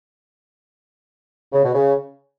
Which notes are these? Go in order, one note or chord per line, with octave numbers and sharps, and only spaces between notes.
C#3
B2
C#3